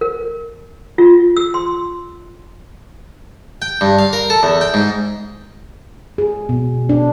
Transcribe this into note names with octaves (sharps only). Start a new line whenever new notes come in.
A#4
F4
E6
C6
G5
G2
F5
A#4
A4
E2
G5
G#2
G#4
B2
D4